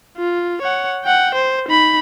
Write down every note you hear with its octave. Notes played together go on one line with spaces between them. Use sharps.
F4
C#5 F#5
F#5 G5
C5
D#4 B5